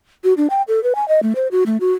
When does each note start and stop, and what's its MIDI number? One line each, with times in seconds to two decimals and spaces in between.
0.24 0.34 66
0.37 0.47 62
0.50 0.62 79
0.68 0.82 69
0.83 0.93 71
0.95 1.07 80
1.08 1.20 75
1.23 1.33 57
1.35 1.48 72
1.52 1.64 66
1.66 1.77 57
1.80 1.93 66